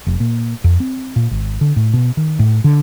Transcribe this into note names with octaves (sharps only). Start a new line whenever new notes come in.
F1
A#2
F2
C4
A#2
G#1
D3
A2
B2
D#3
A2
D3